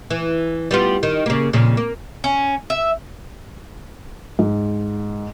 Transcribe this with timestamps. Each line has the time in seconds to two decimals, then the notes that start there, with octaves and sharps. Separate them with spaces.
0.10 E3
0.71 G3 B3 F4
1.03 D#3
1.26 C#3 A#3
1.53 F2 A#2 C#3
1.77 A#3
2.24 C#4
2.70 E5
4.39 G#2